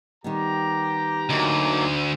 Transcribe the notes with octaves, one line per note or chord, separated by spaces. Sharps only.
D#3 G3 B3 G4 A#5
D2 F#3 A#3 D#4